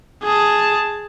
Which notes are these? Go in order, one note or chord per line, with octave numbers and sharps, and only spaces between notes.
G#4 A5